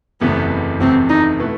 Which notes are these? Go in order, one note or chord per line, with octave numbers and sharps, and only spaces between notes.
F#1 E2 C3 E3 A3 B3
F#1 E2 C3 E3 A3 C4
D#4
B2 A3 E4 B4